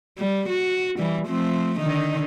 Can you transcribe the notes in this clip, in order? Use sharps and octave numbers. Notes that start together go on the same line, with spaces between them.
G3
F#4
E3 G3
F3 A3 C4
D3 D#3 D#4